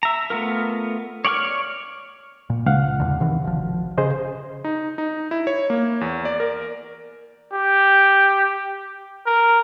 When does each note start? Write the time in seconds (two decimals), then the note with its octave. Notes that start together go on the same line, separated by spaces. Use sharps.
0.03 E5 A#5
0.30 A3 B3 F4 A#4
1.25 C#5 D5 F#5 C#6 F6
2.50 A#2
2.66 C#2 F5 F#5
3.00 E2 D3
3.20 C3 D#3 E3
3.44 G#1 F3
3.98 C#3 G#4 C5 D#5
4.64 D#4
4.98 D#4
5.31 E4
5.47 C#5
5.70 A#3
6.01 E2
6.25 D5
6.40 A#4
7.52 G4
9.26 A#4